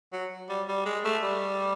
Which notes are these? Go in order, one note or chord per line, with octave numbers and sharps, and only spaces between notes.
F#3
G3
G3
G#3
A3
G3